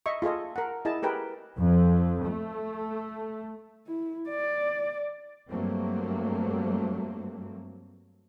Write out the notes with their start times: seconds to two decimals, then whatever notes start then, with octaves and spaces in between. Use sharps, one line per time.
0.06 D#5 E5 C#6
0.22 F4 G#4 A4 D#5
0.56 A#4 F#5
0.85 E4 G#4 D#5 A5
1.03 G4 G#4 A#4 B4 G5
1.58 F2
2.27 A3
3.86 E4
4.29 D5
5.50 G2 F#3 A3 A#3 C4